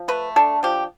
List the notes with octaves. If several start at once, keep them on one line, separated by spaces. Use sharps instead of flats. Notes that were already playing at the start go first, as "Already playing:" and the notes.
Already playing: F3
A3 B4
D4 A4
F3 G4